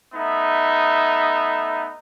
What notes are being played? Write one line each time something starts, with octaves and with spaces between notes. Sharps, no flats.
A3 B3 D#4 E5